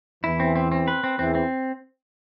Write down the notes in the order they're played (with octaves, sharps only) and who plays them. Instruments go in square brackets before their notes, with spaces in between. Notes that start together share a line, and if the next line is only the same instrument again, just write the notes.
[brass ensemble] E2 E3 [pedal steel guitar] E4
[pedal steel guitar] C4
C4
C4
B4
C4
[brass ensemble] E2 E3 [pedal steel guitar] C4
[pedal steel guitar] C4